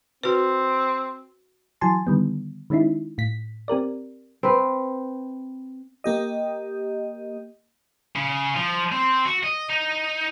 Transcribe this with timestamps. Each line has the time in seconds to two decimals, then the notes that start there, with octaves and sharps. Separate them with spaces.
0.23 C4 F#4 B4
1.81 E3 F#3 G#5 A5 C6
2.07 D3 D#3 G3 B3
2.70 D#3 G#3 C#4 D#4 E4
3.18 A2 B6
3.68 C4 G4 A#4 D5
4.43 C4 B4
6.04 A#3 G4 D#5
8.16 C#3
8.56 F3
8.92 C4
9.25 F#4
9.43 D#5
9.69 D#4